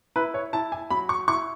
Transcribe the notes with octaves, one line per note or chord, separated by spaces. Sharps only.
E4 B4
C#5
E4 A5
G#5
F#3 B5
C#6
E4 C#6